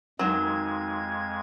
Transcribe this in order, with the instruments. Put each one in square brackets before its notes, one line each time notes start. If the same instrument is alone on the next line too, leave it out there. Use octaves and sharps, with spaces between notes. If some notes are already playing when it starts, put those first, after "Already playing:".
[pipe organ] F2 G#3 G#6 [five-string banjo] D#3 F#3